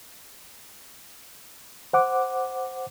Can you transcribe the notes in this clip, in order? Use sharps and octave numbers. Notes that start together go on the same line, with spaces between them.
C5 F#5 D6